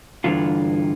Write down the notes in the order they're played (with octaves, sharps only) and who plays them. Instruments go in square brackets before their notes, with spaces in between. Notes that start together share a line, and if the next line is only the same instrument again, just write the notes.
[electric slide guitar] G2 D3 E3 F4